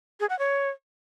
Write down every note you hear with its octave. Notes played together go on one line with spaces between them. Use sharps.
G#4
F#5
C#5